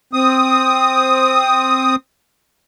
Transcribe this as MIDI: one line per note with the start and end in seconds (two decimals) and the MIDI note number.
0.13 1.96 60
0.13 1.96 87